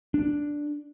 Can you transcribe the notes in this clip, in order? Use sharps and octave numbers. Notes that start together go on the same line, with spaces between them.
D4